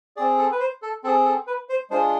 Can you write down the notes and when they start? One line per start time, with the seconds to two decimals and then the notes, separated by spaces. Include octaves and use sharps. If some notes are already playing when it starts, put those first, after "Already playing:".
0.17 G#4 D5
0.19 C4
0.38 A4
0.52 B4
0.60 C5
0.82 A4
1.04 C4 G#4 A4
1.25 A4
1.47 B4
1.69 C5
1.90 G#3 D4 F4 G#4 C5